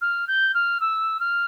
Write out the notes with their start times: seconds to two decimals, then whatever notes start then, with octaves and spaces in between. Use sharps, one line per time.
0.01 F6
0.27 G6
0.54 F6
0.80 E6
1.20 F6